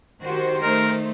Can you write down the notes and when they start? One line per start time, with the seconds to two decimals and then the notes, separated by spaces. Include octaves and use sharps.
0.22 D#3 F#4 G4 C5
0.63 A3 D#4 A#4